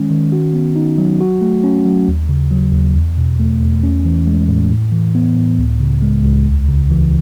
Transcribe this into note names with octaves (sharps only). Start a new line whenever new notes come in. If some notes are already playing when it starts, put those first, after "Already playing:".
Already playing: D#3 G#3 C#4
D#3
F#4
B3
D#4
F#3
F#4
A3
C#4
F#3
D#2
C#3
F#3
D#2
E2
B2
A3
E2
C#4
E3
G#3
A2
A2
E3
B3
A2
C#2
C#3
G#3
C#2
D#2
C#3
E3